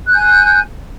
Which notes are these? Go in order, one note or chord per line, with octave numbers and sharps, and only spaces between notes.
G#5 F#6 G6